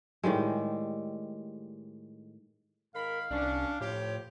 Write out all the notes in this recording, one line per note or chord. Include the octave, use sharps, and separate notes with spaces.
A2 D#3 G3 G#3
G#2 D#3 A#4 F5 B5
C2 C#4 D4
A2 F3 G4 C#5